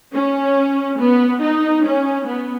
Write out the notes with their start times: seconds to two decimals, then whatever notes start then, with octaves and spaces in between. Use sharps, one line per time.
0.14 C#4
0.99 B3
1.41 D#4
1.84 C#4
2.27 B3